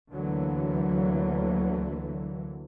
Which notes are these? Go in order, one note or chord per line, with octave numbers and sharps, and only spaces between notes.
D2 D3 E3 F#3 A#3